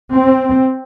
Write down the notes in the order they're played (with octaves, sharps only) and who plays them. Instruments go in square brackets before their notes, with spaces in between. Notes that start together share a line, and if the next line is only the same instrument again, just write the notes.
[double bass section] C4